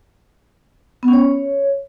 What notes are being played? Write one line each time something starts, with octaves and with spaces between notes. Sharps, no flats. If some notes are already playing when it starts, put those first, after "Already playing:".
B3
C#4
C#5